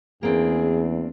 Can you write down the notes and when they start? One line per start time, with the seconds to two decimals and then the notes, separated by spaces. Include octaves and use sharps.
0.23 E2 A#3 C4 D4 G#4